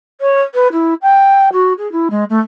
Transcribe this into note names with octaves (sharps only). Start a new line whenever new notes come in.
C#5
B4
E4
G5
F#4
G#4
E4
G#3
A3